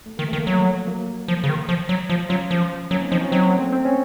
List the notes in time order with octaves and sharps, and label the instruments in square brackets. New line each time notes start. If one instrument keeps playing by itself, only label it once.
[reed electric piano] A3
[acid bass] D#3 [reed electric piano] A#3
[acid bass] D#3 [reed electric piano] A3
[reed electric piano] A#3
[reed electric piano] F3 A3 [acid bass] F#3
[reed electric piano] F#3 A#3
[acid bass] F3
C#3
D#3
F3
F#3
[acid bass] F3 [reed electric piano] F4
[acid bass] F#3 [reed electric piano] C#4 F4
[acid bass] F3
[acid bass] F#3 [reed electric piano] A#3 C#4
[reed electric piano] C4 D#4
[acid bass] F3 [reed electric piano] C4 D#4
[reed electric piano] C#4 F4
[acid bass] F#3 [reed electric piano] C4 D#4
[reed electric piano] A#3 C#4
A3 C4
C4
C#4